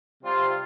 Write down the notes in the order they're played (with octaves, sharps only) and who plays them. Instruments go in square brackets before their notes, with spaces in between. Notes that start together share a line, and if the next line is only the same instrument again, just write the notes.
[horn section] C3 G3 C4 F4